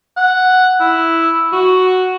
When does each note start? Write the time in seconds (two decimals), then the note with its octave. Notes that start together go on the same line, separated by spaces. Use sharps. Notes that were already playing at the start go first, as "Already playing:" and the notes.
0.17 F#5
0.80 E4
1.52 F#4